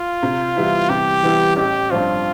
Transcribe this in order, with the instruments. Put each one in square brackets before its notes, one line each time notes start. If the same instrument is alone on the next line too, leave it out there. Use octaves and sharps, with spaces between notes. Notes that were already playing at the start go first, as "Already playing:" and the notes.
Already playing: [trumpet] F4
[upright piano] C3
E3 G3 B3 E4
[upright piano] C3 [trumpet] G4
[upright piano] E3 G3 B3 E4
[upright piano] A1 [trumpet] G4
[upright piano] G2 F3 C4 [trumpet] F4